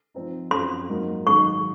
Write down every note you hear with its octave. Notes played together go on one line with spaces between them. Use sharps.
F3 C4 D#4
F#2 F3 C4 F#4 C6
G#2 F#3 A#3 D#4
G#2 D#3 F#3 C#6